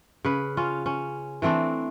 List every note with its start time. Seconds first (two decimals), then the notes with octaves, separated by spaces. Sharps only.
0.25 C#3 B4
0.57 C#4 F4
0.86 C#4
1.42 E3 A3 C4 D4